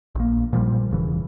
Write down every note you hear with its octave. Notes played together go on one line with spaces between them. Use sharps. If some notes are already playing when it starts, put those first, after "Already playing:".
A#1 A#3
A#2 F3 G3
E1 C#3 E3